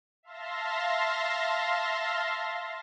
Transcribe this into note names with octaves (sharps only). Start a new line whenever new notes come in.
E5 F5 A5 C6 A#6